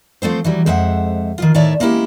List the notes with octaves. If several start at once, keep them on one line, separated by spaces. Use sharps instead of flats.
F3 A3 C4 C5
E3 F#3 G3
F2 G#3 C5 E5 F#5
D#3 F3 F4
A2 D#3 C#5 D5 E5 A5
G#3 A#3 C#4 E4 G4